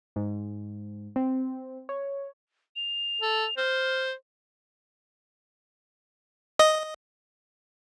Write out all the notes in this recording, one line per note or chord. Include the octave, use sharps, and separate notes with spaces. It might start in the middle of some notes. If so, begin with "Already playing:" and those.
G#2
C4
C#5
F7
A4
C5 F6
D#5